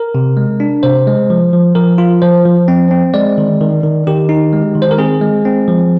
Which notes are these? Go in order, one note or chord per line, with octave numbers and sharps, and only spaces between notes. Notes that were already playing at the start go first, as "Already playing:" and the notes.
Already playing: A#4
C3
G#3
D4
C3 C5
G#3
F3
F3
F3 A#4
F4
F3 C5
F3
C4
C4
G#3 D5
D#3
D#3
D#3
D#3 G4
D#4
G#3
D#3
C5
A#4
C4 G#4
G#3
C4
F3